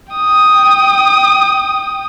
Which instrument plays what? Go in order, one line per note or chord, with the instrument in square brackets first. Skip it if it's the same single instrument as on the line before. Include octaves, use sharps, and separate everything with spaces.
[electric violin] G5 D#6